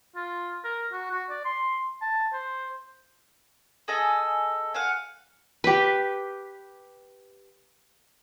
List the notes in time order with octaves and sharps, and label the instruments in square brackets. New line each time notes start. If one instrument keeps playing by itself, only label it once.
[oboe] F4
A#4
F#4
F#4
D5
C6
A5
C5
[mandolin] G#4 A4 D#5
F5 F#5 G#5
[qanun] G4 B4